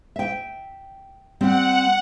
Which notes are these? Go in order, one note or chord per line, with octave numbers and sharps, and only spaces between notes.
E5 G5
G3 C4 F#5